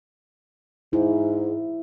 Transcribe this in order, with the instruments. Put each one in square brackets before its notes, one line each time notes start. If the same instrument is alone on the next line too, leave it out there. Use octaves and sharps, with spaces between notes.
[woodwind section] G#2 [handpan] E4